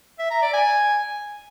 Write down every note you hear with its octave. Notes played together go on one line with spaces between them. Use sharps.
E5
A#5
D5
G#5